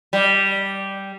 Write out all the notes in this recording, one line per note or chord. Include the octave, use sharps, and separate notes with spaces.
G3